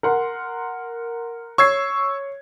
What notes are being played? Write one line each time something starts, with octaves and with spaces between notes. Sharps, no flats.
A#4 F#5 C6
C#5 C#6 E6 G#6 C7